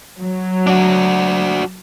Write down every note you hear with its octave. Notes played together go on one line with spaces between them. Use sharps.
F#3
D4 F#4